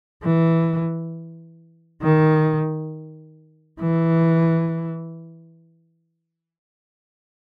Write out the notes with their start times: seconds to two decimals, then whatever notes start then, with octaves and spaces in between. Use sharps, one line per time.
0.24 E3
2.02 D#3
3.80 E3